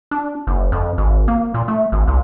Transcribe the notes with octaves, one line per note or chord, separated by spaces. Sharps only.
D4
F#1
F2
G#1
A#3
A#2
A3
G#1
C2